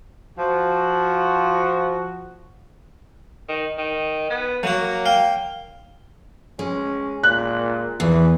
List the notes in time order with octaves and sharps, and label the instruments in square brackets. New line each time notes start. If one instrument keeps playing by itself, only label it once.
[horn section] F3 F#4
[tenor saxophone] D#3
D#3
B3
[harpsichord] F#3 F#4 [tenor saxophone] A#3
[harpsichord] F5 G5
[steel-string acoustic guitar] G#3 [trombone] C#4
[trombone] A#2 [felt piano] F#6
[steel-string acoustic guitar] E2 [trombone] E3